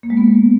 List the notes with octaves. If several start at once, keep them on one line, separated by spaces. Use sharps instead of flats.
A#3
G#3
B3